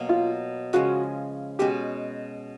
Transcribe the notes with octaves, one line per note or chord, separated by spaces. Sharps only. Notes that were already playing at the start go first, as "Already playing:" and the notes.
Already playing: B2 F#3 A#3
F4
C#3 F3 G#3 C#4 F#4
B2 G#3 C#4 F#4 G4